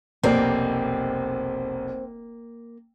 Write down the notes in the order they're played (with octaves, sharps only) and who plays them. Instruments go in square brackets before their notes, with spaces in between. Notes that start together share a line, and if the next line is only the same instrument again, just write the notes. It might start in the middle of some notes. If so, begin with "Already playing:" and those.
[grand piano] F1 B1 [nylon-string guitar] A#3 D5 [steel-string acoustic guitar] C4